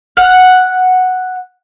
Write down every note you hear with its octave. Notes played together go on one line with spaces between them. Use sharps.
F#5 F6